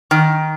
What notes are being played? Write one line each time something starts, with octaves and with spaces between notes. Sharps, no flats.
D#3